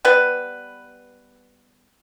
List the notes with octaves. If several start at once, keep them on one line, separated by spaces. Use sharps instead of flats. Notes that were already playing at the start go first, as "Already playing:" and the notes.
G3 B3 B4